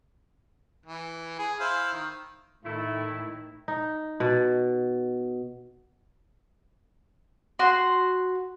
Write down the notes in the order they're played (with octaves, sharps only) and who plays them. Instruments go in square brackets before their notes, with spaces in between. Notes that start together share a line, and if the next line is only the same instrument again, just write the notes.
[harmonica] E3
G#4
E4 C5 F5
D#3
[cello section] A2 D#3 [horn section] A3 E4
[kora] D#4
B2
[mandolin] F#4 C6